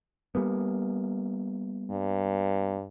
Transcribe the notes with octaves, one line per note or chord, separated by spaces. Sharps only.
G3 A#3 B3
G2